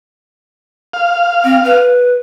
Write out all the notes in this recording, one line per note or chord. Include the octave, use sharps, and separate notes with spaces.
F5
C4
B4